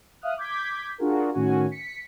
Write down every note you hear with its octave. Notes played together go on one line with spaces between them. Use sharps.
E5 F5 D#6 F6 F#6
D6 G6 G#6 B6
D4 F4 F#4 G#4 A#4
A2 D#3 C#4 F#4 G#5
B6 C#7